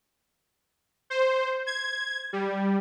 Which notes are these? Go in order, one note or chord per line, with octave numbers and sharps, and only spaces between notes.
C5
G#6
G3